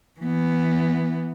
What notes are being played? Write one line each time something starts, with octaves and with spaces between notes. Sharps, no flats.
E3 B3